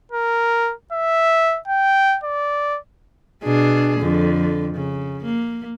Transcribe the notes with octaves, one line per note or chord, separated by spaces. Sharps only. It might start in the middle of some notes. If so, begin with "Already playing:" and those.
A#4
E5
G5
D5
B2 D4 G#4
F2 D3
C#3
A#3